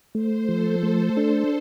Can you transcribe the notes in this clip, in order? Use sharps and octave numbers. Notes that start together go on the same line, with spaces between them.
A3 C5
F3 A4
A3 C5
D4